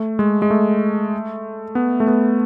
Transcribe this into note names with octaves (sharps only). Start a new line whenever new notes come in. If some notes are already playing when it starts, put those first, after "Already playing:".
Already playing: A3
G#3
G#3
A3
B3
A3
B3